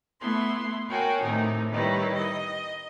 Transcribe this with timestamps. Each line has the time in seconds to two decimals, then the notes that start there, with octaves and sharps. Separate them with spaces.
0.21 A3 B3 E4 C6
0.90 F#4 A#4 C#5 F5 G5 G#5
1.22 A2 C3 D#3 A3 D#4
1.71 D#3 G3 D#4 E4 B4 C#5
2.14 D#5